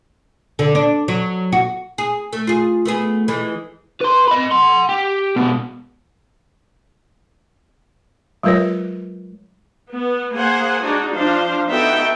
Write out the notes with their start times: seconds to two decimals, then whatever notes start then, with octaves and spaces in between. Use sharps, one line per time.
0.59 D3
0.75 D4
1.08 F#3
1.52 F#4
1.98 G#4
2.33 A3
2.47 F4 G#4
2.85 A3 B3 G#4
3.28 E3 G#3 A3
4.01 B4 C6
4.28 D#5 B5
4.51 F#5 C6
4.89 G4
5.36 B2 G#3
8.43 F#3 G#3 F4 A#4 B4 C#5
9.92 B3
10.35 A#3 G#4 C5 F#5 G#5
10.82 G#3 D4 D#4 F#4
11.15 F3 D4 C5 F5
11.68 B3 D#4 F#4 A4 E5 G5